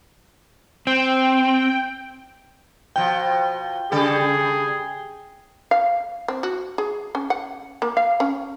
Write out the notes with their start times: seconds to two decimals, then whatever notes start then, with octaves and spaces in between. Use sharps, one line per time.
0.87 C4 G5
2.96 B2 F3 G5
3.92 C#3 G3 G#4 A4
5.71 F5
6.28 C4
6.43 F#4
6.78 G#4
7.15 C#4
7.30 F#5
7.82 A#3
7.97 F5
8.20 C#4